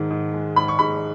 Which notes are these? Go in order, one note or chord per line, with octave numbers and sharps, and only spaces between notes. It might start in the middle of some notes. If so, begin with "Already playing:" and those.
Already playing: G#2 D#3
G#2
G#3
G#2 B5
C#6
G#2 B5